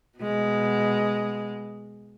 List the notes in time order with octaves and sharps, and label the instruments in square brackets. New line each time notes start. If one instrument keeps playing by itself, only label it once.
[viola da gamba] B2 G#3